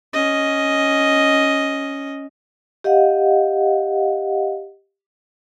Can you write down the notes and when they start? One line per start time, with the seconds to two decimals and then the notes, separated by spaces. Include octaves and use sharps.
0.13 C#4 D#5
2.84 G4 D#5 F5 F#5